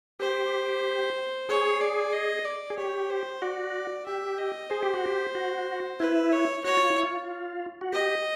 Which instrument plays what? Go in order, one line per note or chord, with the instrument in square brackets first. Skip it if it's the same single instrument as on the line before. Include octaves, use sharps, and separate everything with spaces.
[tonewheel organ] G4 [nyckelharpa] C5
[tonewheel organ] G#4 [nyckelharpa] C#5
[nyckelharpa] D5
D#5
D5
[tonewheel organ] G#4
[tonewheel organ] G4 [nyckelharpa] C#5
[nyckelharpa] C5
[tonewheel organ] F#4 [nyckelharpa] D5
[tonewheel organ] G4 [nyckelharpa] E5
[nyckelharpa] D#5
[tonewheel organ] G#4 [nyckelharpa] C5
[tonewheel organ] G4
F#4
G4
F#4
[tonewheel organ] E4 [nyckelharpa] B4
[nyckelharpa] C#5
[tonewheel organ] F#4 [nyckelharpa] C#5
[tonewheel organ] F4
E4
F4
F#4
[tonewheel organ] G4 [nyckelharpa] D#5